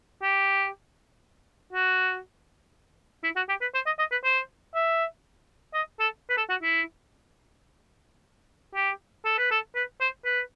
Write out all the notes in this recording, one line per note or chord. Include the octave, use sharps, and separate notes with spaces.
G4
F#4
E4
F#4
G4
B4
C5
D#5
D#5
B4
C5
E5
D#5
A4
B4
A4
F#4
E4
G4
A4
B4
A4
B4
C5
B4